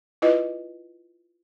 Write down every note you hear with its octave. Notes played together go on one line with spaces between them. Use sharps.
E4 F4 B4 D#5